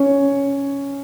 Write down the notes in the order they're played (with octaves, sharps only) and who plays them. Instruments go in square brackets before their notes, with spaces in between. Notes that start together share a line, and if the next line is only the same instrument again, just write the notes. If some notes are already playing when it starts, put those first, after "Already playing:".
Already playing: [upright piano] C#4 C#5